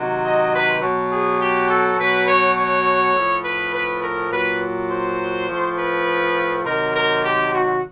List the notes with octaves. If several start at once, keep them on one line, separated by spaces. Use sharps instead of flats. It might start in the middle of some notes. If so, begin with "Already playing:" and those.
Already playing: C3 D#3 F#3
D#5
B4
B2 F#3
G#4
G4
A4
B2 F#3 B4
C#5
C#5
A2 F3
B4
B4
A#4
A#2 F#3 B4
C5
A2 F3
B4
C3 D#3 F#3 A#4
A#4
G4
F#4